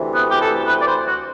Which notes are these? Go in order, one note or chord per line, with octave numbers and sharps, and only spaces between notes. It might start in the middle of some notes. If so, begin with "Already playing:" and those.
Already playing: D2 C3 E3
B3
G4
A4
B4
D5
C5
F#4